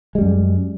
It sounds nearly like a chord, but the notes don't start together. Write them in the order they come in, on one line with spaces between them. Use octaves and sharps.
G#3 G3 F#2